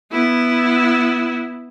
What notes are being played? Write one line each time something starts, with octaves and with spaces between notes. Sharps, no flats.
B3 E4